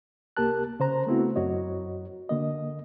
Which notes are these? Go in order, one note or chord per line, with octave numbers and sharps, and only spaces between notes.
C2 A#3 G4 A#4 A5 F#6
C#3 C5 A#5
A3 B3 C4 E4 F#4
F#2 F#4 C#5 D#5
D3 A#3 D#5